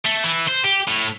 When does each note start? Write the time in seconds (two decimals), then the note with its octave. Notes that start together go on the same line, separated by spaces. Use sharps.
0.06 A3
0.24 E3
0.49 C5
0.64 G4
0.88 A2